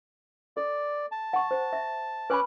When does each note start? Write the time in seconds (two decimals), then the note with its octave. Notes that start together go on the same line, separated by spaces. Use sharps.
0.57 A4 D5
1.11 A5
1.33 F#5 C#6
1.51 C5
1.73 E5
2.30 C#4 B4 G#5 B5 D6 F#6